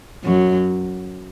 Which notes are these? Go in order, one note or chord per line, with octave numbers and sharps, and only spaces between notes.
F#2 F#3